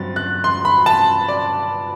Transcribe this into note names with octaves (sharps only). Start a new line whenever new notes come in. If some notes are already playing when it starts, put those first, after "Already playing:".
Already playing: G2 F#3 C4 A6
F#6
C6
B5
A5
D5